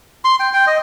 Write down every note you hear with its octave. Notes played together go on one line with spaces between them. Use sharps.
C6
G5
G5
D#5